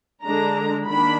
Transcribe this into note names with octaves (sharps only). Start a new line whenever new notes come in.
D3 G#3 D4 A#5
D#3 A#3 D4 B5